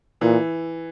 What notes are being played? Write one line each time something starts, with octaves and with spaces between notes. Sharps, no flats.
A#2 E3